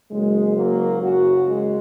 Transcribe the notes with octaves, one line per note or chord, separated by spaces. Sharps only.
F#1 F#2 F#3 G#3
F#3 A#3
F#1 F#2 C#3 C#4 F#4
G#3